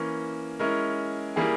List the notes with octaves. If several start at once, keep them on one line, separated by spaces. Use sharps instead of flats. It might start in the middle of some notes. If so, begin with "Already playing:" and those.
Already playing: E3 A#3 C#4
G#3 C#4 E4 A#4
G3 A#3 E4 G#4